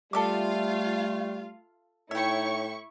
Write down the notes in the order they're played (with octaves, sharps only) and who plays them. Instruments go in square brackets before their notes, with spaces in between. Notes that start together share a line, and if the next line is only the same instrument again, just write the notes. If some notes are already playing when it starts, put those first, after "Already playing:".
[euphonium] G3 [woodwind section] A3 [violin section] F4 F5 [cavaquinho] A4 E5 D6
[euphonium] A2 [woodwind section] D#4 C#5 [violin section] E4 C#6 [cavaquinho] E5 G5